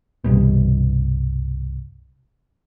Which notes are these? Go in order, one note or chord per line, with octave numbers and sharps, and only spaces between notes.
C2 G2 B2